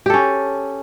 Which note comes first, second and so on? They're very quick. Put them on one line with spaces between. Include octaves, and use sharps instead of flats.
G4 A4 C#4